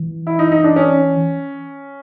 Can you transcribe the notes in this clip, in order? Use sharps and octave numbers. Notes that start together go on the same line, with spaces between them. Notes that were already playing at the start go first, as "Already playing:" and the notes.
Already playing: E3
E4
D#4
D#4
D4
C#4